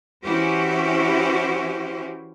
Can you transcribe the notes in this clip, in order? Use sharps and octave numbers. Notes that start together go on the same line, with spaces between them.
E3 C#4 E4 F#4 G4 C5